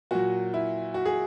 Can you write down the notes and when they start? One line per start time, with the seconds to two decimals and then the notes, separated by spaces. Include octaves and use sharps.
0.11 A#2 F#3 F#4
0.54 E4
0.94 F#4
1.05 G#4